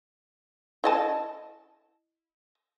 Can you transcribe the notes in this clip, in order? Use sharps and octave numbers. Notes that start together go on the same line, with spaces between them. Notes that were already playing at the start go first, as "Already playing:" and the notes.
E4 D#5 A5